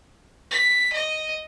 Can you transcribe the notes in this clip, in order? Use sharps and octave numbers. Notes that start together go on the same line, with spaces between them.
B6
D#5